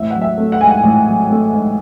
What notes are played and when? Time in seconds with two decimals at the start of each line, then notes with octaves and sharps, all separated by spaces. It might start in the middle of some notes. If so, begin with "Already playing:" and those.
Already playing: A1 E5
0.10 F#3 F#5
0.22 E5
0.38 A3
0.52 F#5
0.61 G#2 G#5
0.69 F#5
0.83 A1
1.07 F#3
1.29 A3
1.52 G#2